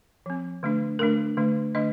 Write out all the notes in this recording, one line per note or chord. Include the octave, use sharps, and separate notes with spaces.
F3 C4
D3 A3 D4
D3 A3 D4 A#4
D3 A3 D4
D3 A3 D4 D#5